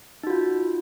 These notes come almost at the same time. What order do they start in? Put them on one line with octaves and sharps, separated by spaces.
D#4 F#4 F4